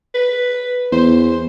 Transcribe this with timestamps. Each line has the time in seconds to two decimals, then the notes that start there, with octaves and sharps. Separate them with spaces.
0.14 B4
0.92 E2 C5